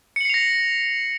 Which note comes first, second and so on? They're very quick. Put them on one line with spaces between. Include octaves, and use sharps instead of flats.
C#7 F#7 C7 F7 A#6